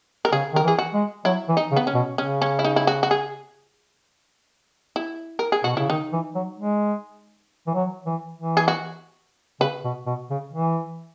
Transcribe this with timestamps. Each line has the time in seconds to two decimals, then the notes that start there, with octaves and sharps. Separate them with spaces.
0.25 A#4
0.32 C#3 G#4
0.53 D#3 A#4
0.63 E3
0.68 G#4
0.79 F#4
0.94 G#3
1.25 F#3 E4
1.49 E3
1.57 D#4
1.71 C#3
1.76 B3
1.87 C#4
1.94 B2
2.17 C#3 C#4
2.42 C#4
2.59 E4
2.64 D#4
2.76 E4
2.87 F#4
3.03 F#4
3.11 G#4
4.96 E4
5.39 A#4
5.52 G#4
5.64 B2 F#4
5.77 C#3 E4
5.90 D#3 D#4
6.13 E3
6.35 F#3
6.58 G#3
7.67 E3
7.75 F#3
8.06 E3
8.36 E3
8.57 G#4
8.68 F#4
9.60 C#3 B4
9.84 B2
10.06 B2
10.30 C#3
10.53 E3